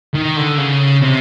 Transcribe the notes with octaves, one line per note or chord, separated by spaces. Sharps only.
D#3
D3
C#3
C3